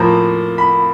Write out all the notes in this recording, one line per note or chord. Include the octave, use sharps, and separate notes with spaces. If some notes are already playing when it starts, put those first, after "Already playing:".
Already playing: A2 F3 A#3 A#5
B5